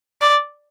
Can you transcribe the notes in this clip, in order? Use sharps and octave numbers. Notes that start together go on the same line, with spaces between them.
D5